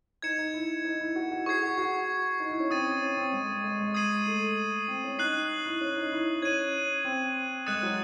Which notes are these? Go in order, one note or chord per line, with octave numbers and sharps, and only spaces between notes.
D#4 G#6 C#7 E7
D#4
E4
D#4
E4
F#4
F#4
G#4 C#6 G#6 C7
F#4
F#4
D#4
E4
C#4
C4 D#6 A6 D#7
C#4
C#4
C4
G#3
G#3
G#3
G#3
D#6 G#6 C7 D#7 F#7
A3
C4
C#4
D#4 F#6 C7 F#7
E4
C#4
D#4
E4
C#4 G#6 D#7 F#7
C4
G#3 D#6 F#6 A6 C#7 E7
F#3